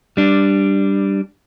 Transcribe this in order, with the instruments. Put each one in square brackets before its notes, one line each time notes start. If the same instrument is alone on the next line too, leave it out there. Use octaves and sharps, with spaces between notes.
[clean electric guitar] G3 D4